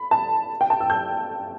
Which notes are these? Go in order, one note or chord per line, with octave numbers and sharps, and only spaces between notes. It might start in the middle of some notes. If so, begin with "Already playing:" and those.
Already playing: B5
A5
G5
A5
E6
G6